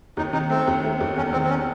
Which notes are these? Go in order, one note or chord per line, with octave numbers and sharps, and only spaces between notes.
D#2 D#4
D#3 D#4
A3 C4
D#2
A3
D#2
E2 C#4
D#3 C4
C4
C#4